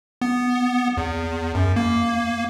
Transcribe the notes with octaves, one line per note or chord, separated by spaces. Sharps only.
B3
E2
F#2
A#3